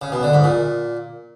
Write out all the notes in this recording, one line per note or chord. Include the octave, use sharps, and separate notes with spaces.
C#3
B2
D3
G#2
A#2